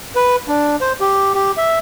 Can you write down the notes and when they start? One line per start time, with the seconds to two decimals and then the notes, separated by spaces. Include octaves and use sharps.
0.16 B4
0.48 D4
0.81 C5
1.00 G4
1.34 G4
1.57 E5